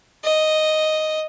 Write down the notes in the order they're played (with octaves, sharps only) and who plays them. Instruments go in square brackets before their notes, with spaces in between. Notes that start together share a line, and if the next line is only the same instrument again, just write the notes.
[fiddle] D#5